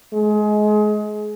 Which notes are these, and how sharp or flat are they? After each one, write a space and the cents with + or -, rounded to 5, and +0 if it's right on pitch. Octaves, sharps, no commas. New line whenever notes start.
G#3 +25